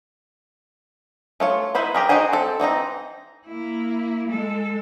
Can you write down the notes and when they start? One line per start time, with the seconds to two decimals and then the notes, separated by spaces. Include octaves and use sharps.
1.40 A3 F4 C#5
1.75 D#4 E4 B4 C5 B5
1.95 G4 G#4 A#4
2.09 D#4 F#4 G#4 C5 G#5
2.33 C4 A4
2.60 E3 C4 D#4 A#5
3.46 A#3 E4
4.27 G#3 A4